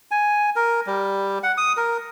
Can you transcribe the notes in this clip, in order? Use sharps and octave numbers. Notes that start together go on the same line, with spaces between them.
G#5
A#4
G3
F#5
D#6
A#4